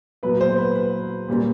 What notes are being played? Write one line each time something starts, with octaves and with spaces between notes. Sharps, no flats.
A#2 F#3 B3 B4
C5
B4
B4
A#2 G3 A#3 C#4